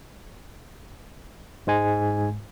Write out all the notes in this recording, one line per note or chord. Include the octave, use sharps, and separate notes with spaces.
G#2 G#3 G#5